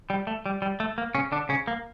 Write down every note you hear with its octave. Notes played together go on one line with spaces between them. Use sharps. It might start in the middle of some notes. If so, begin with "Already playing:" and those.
G3
A3
G3
G3
A3
A#3
C#3 C#4
D3 D4
C#3 C#4
A#3